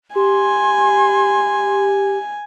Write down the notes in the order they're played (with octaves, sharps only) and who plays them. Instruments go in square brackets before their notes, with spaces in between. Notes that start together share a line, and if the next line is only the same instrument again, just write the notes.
[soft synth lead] G4 [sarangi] G#5 [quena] C6